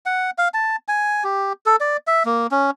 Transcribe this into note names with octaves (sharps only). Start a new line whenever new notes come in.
F#5
F5
A5
G#5
G4
A4
D5
E5
A#3
C#4